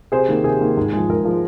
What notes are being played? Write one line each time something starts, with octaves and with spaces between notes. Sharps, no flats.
C3 G#4 C5
D#3 A#3
C3 G#4
D#3 A#3
G#2
F3 G#3
G#2 A#4
F3 G#3